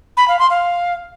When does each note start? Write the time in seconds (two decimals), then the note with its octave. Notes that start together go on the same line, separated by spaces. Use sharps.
0.17 B5
0.28 F5
0.39 C6
0.50 F5